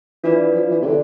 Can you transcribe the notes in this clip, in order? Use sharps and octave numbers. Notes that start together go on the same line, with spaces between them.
E3 D4 F4 B4 D5
F3
E3
C3
D3